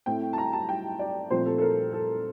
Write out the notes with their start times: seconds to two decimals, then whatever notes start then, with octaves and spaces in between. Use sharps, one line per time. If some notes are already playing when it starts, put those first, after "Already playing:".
0.06 A2 A3 C4 G5
0.33 A5
0.38 A#5
0.53 A5
0.69 G5
0.99 D5
1.30 A#2 F3 A3 C4 C5
1.46 A4
1.58 A4
1.62 A#4
1.93 A4